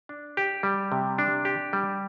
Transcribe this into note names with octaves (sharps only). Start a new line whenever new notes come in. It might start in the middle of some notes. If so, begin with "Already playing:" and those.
D4
G4
G3
C3
D4
G4
G3